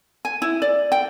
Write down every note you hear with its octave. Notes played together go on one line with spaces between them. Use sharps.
G#5
E4
D5
G5